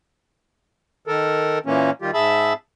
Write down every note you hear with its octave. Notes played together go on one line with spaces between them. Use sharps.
D#3 A4 A#4
A#2 E3 A#3 C#4
D#3 G3 F4 G4
G#2 G#4 E5 A5 B5 E6